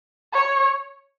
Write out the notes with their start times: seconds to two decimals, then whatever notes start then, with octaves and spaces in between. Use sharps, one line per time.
0.33 C#5